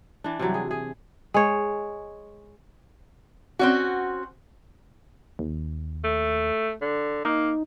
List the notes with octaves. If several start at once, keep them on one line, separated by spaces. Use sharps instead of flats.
E3 D4
C3 E3 F#3 G3
G#4
G#4
G#3 C#5
C4 C#4 F#4
D#2
A3
D3
A#3 D#4